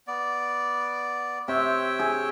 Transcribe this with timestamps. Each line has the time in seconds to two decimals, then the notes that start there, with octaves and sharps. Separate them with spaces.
0.08 B3 D5
1.48 C3 C#5 E5 G5
1.99 G#4